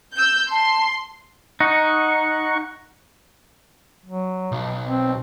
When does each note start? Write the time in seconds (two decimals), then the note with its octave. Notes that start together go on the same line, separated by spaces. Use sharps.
0.15 E6 G6
0.51 A5 C6
1.60 D#4 F#5 C#6
4.06 F#3
4.52 B1
4.85 C4